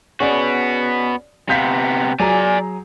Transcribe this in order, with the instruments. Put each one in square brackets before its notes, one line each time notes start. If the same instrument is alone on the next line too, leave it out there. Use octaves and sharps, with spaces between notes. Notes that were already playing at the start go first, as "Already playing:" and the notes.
[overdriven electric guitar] B3 F#4 [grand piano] C#4 G#4 D5
[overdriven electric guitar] C3 B3 [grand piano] F5 G6 B6
[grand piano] F#3 G#4 A#5 [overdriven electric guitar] D5 G#5